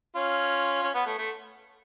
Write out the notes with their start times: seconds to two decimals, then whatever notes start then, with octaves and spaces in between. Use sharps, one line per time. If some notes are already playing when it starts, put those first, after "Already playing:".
0.15 C#4 F4
0.84 C#4
0.95 B3
1.06 A3
1.18 A3